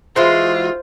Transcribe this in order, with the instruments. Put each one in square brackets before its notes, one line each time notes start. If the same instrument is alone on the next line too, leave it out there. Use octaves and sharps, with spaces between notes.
[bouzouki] E3 G#3 F#4 [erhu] F4 [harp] C5